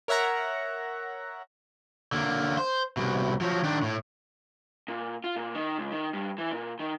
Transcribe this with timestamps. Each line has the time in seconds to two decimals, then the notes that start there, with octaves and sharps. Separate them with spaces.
0.08 A#4 C#5 E5 F#5 A#5
2.12 D3 A#3
2.58 C5
2.97 C2 B2
3.41 F3 F#3
3.64 D#3 D4
3.82 A2
4.88 A#2
5.24 F4
5.36 A#2
5.54 D#3
5.78 C#2
5.92 D#3
6.13 G2
6.38 E3
6.51 A#2
6.79 D#3